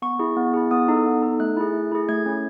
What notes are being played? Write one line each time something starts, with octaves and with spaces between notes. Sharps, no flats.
B3 C#6
E4 G#4
B3
E4 G#4
B3 D#6
D#4 A4
B3
D#4 A4
A3 F#6
E4 G#4
A3
E4 G#4
A3 G#6
C#4 E4